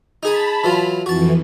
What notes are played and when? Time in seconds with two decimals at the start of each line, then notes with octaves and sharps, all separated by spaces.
0.23 D#4 G#4 G#5 A5 B5
0.64 E3 F#3 F4
1.06 F2 E3 F#4 A5